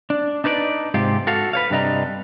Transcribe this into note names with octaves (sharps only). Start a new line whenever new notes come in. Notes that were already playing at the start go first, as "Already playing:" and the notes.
D4
D4 D#4 B4 C#5 D5
G#2 C3 F4 G4
F#4 A4 F5
B4 C#5 F5
G2 C3 D4 D#5 A#5